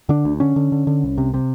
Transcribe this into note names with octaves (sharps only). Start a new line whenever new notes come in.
D3 D4
D2
D3 C#4
D3
D3
D3
C2
C3
C3